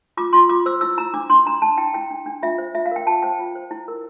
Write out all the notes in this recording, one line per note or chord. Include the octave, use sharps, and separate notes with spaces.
F4 D6
F4 C6
F4 D6
C5 E6
E4 E6
E4 A#5
D4 D6
D4 C6
D4 A#5
D4 A5
E4 G5
E4 G5
D4
D4
F4 E5
C5
F4 E5
F5
A#4 G5
F4 A5
C5 G5
F4
C5
E4
A#4